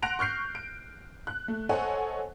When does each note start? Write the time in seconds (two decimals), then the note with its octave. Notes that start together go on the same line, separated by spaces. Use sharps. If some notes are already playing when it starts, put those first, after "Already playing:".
0.02 F#5 C6 F#6 A#6 D7 F7
0.19 C#6 F6 G6 C7
0.55 D7
1.27 F#6
1.48 A3
1.69 A4 C5 C#5 D#5 F#5 G#5